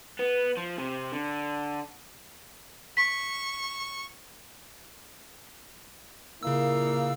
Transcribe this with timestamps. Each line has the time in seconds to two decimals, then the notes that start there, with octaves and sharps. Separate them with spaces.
0.19 B3
0.57 F3
0.78 C3
1.13 D3
2.97 C#6 B6
6.43 A#2 C#3 A#3 E4 F5 E6